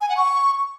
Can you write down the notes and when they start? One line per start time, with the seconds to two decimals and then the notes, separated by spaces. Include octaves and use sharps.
0.01 G#5
0.09 F#5
0.17 C#6